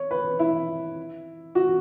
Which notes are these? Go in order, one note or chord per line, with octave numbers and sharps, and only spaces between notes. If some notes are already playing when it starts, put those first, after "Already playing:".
Already playing: C#5
B4
E4
F#4